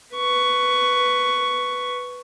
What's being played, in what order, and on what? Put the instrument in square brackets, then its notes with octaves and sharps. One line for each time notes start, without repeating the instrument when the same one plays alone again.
[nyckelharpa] B4 C#6